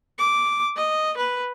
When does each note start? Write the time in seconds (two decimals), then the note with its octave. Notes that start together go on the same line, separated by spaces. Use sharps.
0.19 D6
0.76 D#5
1.17 B4